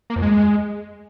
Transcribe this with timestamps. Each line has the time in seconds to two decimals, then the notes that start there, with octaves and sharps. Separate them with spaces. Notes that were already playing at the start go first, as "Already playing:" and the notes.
0.10 A#3
0.16 F2
0.22 G#3